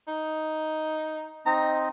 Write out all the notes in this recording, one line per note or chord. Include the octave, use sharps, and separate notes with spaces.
D#4
C4 D#4 D#5 A#5